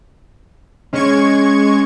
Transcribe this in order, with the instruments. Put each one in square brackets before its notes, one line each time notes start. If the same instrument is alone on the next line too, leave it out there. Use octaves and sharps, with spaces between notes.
[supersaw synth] G#3 C#6 G#6 [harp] C#4